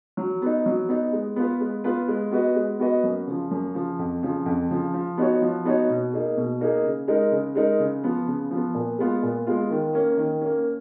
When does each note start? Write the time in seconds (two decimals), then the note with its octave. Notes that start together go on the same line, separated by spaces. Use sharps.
0.17 F#3
0.42 B3 D#4
0.66 F#3
0.89 B3 D#4
1.13 G#3
1.36 B3 F4 B4
1.60 G#3
1.84 B3 F4 B4
2.08 G#3
2.31 B3 F#4 B4 D#5
2.56 G#3
2.80 B3 F#4 B4 D#5
3.04 F#2
3.27 C#3 F3
3.51 F#2
3.74 C#3 F3
3.99 F2
4.23 C#3 F3
4.46 F2
4.70 C#3 F3
4.94 F3
5.18 B3 D#4 F#4 C#5
5.41 F3
5.65 B3 D#4 F#4 C#5
5.89 B2
6.13 A#3 D#4 G#4
6.37 B2
6.61 A#3 D#4 G#4
6.84 C#3
7.08 G#3 D#4 A#4
7.31 C#3
7.55 G#3 D#4 A#4
7.80 C#3
8.04 F3 B3
8.27 C#3
8.51 F3
8.56 B3
8.75 A#2
8.99 G#3 B3 F4
9.23 A#2
9.47 G#3 B3 F4
9.70 D#3
9.93 A#3 C#4
10.17 D#3
10.41 A#3 C#4